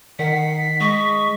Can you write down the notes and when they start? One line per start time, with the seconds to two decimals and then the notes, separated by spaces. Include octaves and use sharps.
0.19 D#3 F#5 B6 C7
0.80 G#3 D#5 C#6